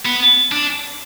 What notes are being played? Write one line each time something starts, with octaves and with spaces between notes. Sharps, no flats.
B3
D4